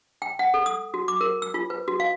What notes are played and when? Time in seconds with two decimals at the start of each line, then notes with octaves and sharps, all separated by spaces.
0.22 G5
0.39 F#5
0.54 A4
0.66 D#6
0.94 F#4
1.08 D6
1.21 A#4
1.42 E6
1.54 F4
1.70 B4
1.88 F#4
2.00 F5